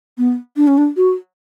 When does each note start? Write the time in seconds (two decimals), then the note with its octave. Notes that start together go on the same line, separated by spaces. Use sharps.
0.18 B3
0.57 D4
0.68 C#4
0.78 D4
0.97 F#4